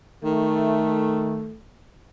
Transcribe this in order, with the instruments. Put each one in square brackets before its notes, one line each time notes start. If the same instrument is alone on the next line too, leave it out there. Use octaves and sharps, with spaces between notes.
[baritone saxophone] D#3 [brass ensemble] A3